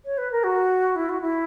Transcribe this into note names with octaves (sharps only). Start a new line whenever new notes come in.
C#5
B4
A#4
F#4
E4
F#4
E4